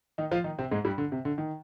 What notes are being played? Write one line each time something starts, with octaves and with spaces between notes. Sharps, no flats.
D#3 D#4
F3 F4
D#3 D#4
C3 C4
G#2 G#3
G2 G3
D3
C3
D3
D#3